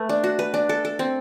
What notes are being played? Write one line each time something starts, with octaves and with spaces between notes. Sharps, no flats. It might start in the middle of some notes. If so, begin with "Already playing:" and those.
Already playing: A3 B4
D4
F#4
B4
D4
A4
A4
C4